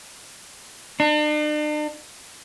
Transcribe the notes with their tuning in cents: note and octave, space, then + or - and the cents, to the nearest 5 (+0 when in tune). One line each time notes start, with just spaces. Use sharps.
D4 +45